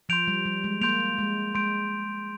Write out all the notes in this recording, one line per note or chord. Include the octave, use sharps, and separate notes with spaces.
F3 C6 G6 D7 F7
G3
G3
G#3
A#3 C6 G6 D7 F7
G#3
G#3 C6 G6 D7